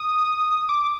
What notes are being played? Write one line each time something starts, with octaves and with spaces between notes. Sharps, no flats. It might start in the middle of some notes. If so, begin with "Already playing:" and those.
Already playing: D#6
D6